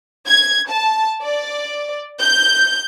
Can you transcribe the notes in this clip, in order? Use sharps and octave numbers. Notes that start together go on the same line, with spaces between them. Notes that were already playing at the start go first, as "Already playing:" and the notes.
G#6
A5
D5
G6